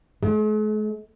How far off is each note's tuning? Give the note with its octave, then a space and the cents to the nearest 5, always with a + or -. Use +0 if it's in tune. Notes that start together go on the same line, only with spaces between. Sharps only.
G#3 +45